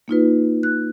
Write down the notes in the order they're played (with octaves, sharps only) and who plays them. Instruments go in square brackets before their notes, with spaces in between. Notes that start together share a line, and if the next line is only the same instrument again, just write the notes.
[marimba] A#3 D#4 F4 B4
F#6